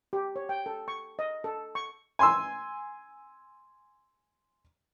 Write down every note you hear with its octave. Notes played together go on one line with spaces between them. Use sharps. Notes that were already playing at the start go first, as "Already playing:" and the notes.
G4
C#5
G5
A4
C#6
D#5
A4
C#6
G#5 C6 E6